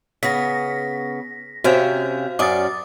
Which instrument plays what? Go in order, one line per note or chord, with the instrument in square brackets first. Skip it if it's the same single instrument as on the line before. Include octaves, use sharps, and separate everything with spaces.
[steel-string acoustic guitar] C#3 B3 [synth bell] A#6 B6
[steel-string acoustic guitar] C3 C#4 G5 [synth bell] F#4 C5 F5
[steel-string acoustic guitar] F#2 C#4 D5 [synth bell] D6 D#6 A6